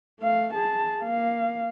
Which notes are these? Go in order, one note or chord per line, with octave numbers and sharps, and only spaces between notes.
A3 F5
G#4 A5
A#3 F5